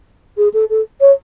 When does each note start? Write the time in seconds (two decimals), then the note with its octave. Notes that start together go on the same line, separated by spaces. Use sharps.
0.38 G#4
0.54 A4
0.70 A4
1.01 C#5